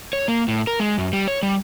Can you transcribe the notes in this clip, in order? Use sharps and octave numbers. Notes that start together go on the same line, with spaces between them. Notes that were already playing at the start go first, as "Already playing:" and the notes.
C#5
A#3
A2
A#4
G#3
F#2
G3
C#5
G3